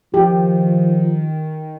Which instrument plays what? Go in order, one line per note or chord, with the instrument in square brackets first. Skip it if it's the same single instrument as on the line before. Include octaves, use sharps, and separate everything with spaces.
[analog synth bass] D#3 [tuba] F3 [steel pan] G4